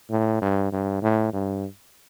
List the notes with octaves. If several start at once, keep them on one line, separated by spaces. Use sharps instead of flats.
A2
G2
G2
A2
G2